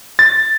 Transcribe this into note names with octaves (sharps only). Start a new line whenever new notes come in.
A6